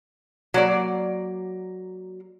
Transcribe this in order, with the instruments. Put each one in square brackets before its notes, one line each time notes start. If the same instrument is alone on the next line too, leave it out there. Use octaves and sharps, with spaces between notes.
[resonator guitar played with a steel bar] F#3 A#3 D5